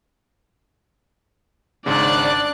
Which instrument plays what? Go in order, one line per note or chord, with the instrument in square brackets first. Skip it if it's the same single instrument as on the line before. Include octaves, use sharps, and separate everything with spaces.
[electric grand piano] G#1 G#2 C#3 [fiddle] D4 F#6 [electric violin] D5